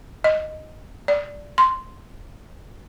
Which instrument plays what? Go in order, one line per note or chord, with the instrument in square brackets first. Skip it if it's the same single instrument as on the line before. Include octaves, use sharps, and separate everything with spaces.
[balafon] D#5
D5
C6